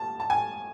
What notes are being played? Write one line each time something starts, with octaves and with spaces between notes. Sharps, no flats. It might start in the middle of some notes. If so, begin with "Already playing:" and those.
Already playing: A5
A5
G#5